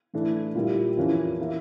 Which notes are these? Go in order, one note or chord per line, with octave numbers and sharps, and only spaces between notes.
A2 E3 A3 D4
A#2 G3 A#3 E4
F2 E3 A#3 C#4
E3 A#3 E4